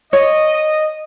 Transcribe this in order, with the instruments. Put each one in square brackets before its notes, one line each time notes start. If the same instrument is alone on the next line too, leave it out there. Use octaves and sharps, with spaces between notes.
[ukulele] C#5 [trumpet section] D#5